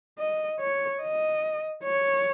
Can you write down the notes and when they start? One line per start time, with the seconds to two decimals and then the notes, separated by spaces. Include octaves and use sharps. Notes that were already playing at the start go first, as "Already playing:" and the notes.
0.19 D#5
0.61 C#5
1.02 D#5
1.83 C#5